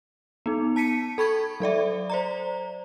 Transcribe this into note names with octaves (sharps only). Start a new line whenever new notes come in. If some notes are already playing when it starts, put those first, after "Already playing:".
B3 D#4
A5 B6 C#7 D#7
A4 B5 C#6 G#6
F#3 A4 D5 E5
C5 D5 A#5